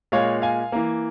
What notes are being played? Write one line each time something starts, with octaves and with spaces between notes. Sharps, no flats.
A#2 G#3 C#5 F5
F5 G#5
E3 A#3